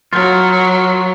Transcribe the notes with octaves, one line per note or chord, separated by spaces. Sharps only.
F#3 F4 A#4